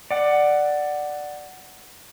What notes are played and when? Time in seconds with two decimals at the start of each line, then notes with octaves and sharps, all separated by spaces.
0.11 D5 F#5